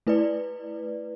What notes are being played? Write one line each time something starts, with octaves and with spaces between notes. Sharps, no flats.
A3 E4 B4 D5